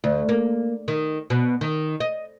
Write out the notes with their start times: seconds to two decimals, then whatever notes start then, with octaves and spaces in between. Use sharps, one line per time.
0.04 D2
0.29 A#3
0.88 D#3
1.30 B2
1.61 D#3
2.00 D#5